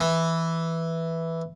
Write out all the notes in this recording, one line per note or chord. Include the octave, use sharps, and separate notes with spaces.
E3